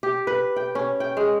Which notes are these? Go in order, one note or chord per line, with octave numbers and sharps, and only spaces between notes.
G4
B4
G5
C#4
G5
G#3